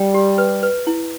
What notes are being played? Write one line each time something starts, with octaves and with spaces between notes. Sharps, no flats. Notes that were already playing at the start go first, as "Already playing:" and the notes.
Already playing: G3 G5
G4
B4
B4
E4